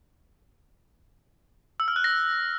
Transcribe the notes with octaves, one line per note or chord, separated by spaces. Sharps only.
E6
F6
F#6
A#6